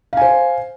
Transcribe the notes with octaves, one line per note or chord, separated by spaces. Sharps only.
C5 F5 G#5